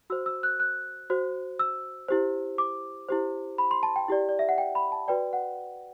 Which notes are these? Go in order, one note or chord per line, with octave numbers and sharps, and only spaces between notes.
F#4 C5 E6
E6
F#6
F#6
F#4 C5
E6
E4 G4 C5
D6
E4 G4 C5
B5
C6
A5
G5
E4 G4 D5
D5
E5
F#5
G5
B5
A5
F#4 B4 D5 G5
F#5